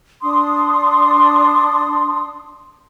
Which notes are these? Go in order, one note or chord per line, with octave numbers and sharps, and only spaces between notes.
D4 C6 D#6